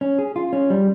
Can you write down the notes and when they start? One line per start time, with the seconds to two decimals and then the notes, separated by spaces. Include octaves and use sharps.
0.01 C#4
0.19 G#4
0.36 F4
0.53 C#4
0.70 G3